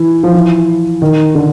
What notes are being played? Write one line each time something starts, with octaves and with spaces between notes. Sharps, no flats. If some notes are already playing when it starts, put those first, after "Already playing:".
Already playing: E3
F3
E3
D#3
D3